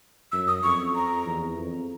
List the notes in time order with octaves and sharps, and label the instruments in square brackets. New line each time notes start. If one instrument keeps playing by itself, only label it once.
[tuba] F#2 [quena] E6
[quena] D#6
[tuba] F2 [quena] C#6
[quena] A#5
[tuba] E2
F2